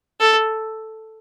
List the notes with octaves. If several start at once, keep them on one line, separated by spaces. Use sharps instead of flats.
A4